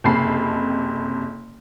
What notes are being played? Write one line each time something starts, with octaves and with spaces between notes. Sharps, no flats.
F#1 F2 C3 A5 B5 C7